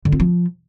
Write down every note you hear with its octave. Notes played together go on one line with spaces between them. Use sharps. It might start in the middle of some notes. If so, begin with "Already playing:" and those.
D3
C4
F3